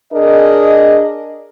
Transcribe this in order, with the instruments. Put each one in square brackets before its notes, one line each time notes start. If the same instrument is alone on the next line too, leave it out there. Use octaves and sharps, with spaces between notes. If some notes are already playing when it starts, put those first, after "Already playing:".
[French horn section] D4 G#4 A#4 D#5